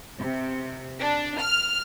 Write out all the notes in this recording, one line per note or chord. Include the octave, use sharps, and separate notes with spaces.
C3
D4
F6